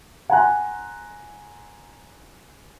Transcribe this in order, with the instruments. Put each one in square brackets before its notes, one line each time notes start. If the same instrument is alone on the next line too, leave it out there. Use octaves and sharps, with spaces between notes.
[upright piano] F#5 G#5 A#5 C6 F#6